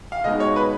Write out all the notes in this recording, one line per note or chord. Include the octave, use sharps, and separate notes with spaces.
F5
B2 G#3 D#4 D#5
C#5
B4